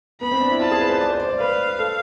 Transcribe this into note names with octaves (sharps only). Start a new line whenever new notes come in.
B3 B5
C4
D4
E4
F4 A5
G#4
B4
C5
D5
C5
D5
D5
B4 F5
A4